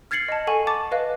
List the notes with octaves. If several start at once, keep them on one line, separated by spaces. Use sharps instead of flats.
F6 G#6 A6 C7 C#7 F#7
D#5 A5
A4 F#5 G#5 C#6 F#7
A5 D6 A6
B4 D#5 F5 F#6